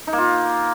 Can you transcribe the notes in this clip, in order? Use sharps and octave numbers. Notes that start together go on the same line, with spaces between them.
D#4
A#3
F4